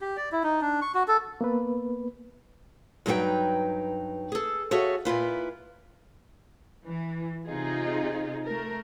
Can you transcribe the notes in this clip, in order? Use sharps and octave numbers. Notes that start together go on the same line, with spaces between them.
G4
D5
E4
D#4
D4
C#6
F#4
A4
A#3 B3 B4
G2 F#3 D#4 G#4 B4 G5
G#4 A4
F#4 G#4 A4 C#5 E5 F5
A#2 E4 F4 B4
E3
C3 D#4 F4 G#4
A3 A#4